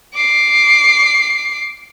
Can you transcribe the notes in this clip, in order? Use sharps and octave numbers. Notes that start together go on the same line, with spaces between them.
D6 C7